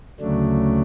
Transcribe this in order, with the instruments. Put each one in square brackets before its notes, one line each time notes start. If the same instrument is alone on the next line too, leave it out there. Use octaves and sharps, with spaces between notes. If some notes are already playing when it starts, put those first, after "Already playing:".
[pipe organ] D2 C#3 F#3 A3 D4